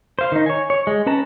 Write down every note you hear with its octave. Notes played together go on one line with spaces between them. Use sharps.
C5 F5
D#3 D#4
C#5 G#5
C#5
G#3
C#4 B4 A5 A#5